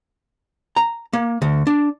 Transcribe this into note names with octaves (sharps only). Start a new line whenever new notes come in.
A#5
A#3
D2
D4